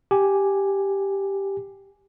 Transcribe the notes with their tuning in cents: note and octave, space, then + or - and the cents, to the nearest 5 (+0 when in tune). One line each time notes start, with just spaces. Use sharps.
G4 +0 G#5 +0